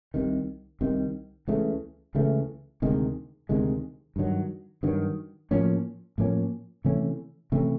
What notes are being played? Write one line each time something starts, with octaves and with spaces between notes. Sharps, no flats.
C2 C3 D#3
C2 C3 D#3
C#2 C#3 E3 A3
C#2 C#3 E3 A3
D2 C3 D#3 G#3
D2 C3 D#3 G#3
G2 D#3 F#3
G2 D#3 F#3
A2 F3 A#3 C#4
A2 F3 A#3 C#4
C3 E3 A3 C#4
C3 E3 A3 C#4